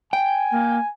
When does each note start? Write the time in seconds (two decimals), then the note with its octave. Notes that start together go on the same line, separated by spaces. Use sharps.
0.13 G5 G#5
0.51 A#3